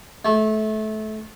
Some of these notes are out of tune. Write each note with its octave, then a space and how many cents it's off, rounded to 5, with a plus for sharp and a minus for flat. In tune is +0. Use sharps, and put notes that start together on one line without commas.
A3 -25